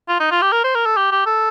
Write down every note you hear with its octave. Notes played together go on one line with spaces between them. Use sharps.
F4
D#4
F4
G4
A#4
C5
A#4
A4
G4
G4
A4